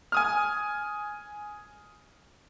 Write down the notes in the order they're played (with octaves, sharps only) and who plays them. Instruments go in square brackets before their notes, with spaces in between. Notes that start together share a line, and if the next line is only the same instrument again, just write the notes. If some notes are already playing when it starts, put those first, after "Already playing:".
[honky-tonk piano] G#5 D#6 F6